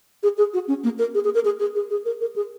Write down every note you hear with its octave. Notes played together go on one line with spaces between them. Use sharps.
G#4
G#4
F#4
C#4
A#3
A#4
G#4
G#4
A#4
G#4
G#4
G#4
G#4
A#4
A#4
G#4